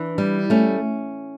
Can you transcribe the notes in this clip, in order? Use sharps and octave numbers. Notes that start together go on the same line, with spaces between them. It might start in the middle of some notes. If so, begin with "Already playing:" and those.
Already playing: E3 D4
G3
A3 C#4